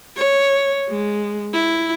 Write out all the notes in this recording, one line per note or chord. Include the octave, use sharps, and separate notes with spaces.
C#5
G#3
E4